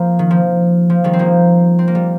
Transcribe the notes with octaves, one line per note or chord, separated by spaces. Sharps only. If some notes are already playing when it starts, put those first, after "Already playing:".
Already playing: F3 A#3 C4
D#3
F3
F3
D#3 G3
C4
F3 A#3
C4
A#3
G3